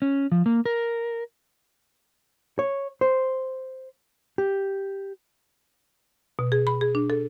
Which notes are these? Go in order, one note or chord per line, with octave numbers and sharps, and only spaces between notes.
C#4
F3
A#3
A#4
C#5
C5
G4
B2
G#4
B5
G#4
D4
A4